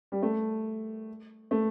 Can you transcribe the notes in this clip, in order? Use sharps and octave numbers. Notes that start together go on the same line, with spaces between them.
G3
A3
A3